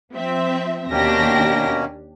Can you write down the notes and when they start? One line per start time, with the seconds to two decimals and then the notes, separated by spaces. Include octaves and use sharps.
0.14 F3 C4 E5
0.91 D#2 B2 A#3 C#4 D4 G4 A#6